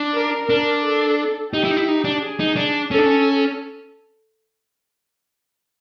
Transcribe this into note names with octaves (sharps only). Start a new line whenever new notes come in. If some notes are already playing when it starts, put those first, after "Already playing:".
Already playing: D4
A#4
D4
A4
D#4 G4
E4
D#4
E4
D#4
D4
G#4
D#4
D4
C#4 A4
D4
C#4